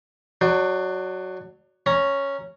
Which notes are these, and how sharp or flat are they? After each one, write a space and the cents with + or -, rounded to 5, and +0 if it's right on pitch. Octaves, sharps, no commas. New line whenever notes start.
F#3 +0 D4 +30
C#4 +0 A#5 +0